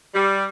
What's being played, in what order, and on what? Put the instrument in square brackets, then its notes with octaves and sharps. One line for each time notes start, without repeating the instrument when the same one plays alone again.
[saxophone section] G3